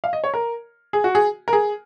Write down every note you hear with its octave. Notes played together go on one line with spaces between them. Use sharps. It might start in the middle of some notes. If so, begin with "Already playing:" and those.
F5
D#5
C#5
A#4
G#4
F#4
G#4
A#4
G#4